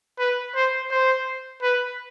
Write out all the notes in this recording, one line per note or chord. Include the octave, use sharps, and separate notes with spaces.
B4
C5
C5
B4